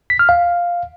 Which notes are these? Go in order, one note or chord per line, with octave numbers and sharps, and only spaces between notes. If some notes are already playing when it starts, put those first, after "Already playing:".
B6
F6
F5